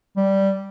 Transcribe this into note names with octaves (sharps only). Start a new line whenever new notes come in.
G3